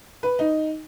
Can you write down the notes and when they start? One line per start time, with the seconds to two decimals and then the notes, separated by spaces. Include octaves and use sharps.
0.23 B4
0.39 D#4